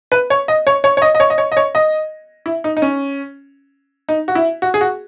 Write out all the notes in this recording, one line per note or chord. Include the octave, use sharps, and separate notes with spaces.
B4
C#5
D#5
C#5
C#5
C#5
D#5
D#5
C#5
D#5
C#5
D#5
C#5
D#5
E4
D#4
D#4
C#4
D#4
F#4
E4
F#4
G#4
F#4